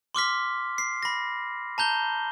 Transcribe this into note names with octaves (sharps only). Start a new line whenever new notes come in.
C6 D6 F6 B6
C7
B5 A#6
A5 A#5 G6 G7